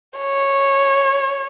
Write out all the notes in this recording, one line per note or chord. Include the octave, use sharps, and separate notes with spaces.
C#5